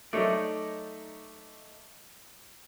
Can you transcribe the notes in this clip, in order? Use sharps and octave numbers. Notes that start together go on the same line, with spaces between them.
F#3 A3 D#4 C#5 D5 E5